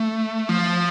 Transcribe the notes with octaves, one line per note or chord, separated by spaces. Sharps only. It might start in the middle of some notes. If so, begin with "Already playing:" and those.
Already playing: A3
F3